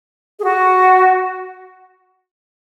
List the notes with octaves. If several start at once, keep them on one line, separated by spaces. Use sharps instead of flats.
G#4
F#4